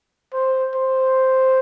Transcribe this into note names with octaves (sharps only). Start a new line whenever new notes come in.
C5
C5